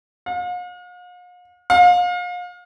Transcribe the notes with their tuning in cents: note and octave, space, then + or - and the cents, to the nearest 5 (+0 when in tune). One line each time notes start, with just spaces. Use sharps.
F5 +45
F5 +35